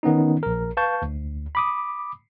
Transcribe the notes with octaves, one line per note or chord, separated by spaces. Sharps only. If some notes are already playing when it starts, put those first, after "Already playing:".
D#3 B3 C#4 D#4
A#1 A#4
B4 F5 A5 C#6 G6
D2
B5 D6 D#6